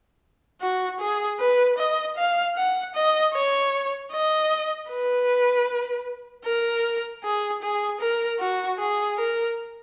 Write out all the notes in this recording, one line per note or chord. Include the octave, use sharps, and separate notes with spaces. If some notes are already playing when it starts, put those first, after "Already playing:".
F#4
G#4
B4
D#5
F5
F#5
D#5
C#5
D#5
B4
A#4
G#4
G#4
A#4
F#4
G#4
A#4